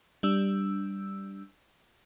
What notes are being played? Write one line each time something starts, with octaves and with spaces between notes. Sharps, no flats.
G3 D4 E6